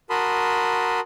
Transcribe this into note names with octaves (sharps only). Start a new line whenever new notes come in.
F#4 A#4 A5 B5 C6 D#6